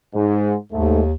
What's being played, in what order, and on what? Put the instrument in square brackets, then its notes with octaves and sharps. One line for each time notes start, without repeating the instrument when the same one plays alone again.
[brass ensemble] G#2
[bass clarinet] D#2 [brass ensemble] G#2 A3